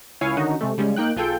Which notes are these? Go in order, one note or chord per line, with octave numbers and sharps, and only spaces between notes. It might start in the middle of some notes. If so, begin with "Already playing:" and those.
C#2 E4 C#5 F5 G#5
D3 D#3 C#4 D#4 F#4
C3 G#3 A3
C#3 G3 G#3 C#4
A#3 D#4 G5 F#6
B1 F4 G#4 A4 G5 G6